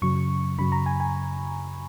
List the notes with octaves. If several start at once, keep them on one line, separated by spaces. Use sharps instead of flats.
F#2 C#3 F#3 C#6
F#2 C#3 F#3 B5
A#5
G#5
G#5